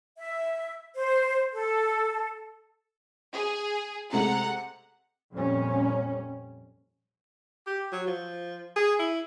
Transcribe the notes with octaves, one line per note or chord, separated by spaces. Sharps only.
E5
C5
A4
G#4
C3 G#3 A3 F#5 A#5
F2 A#2 G3 C#4
G4
F#3
F3
G#4
E4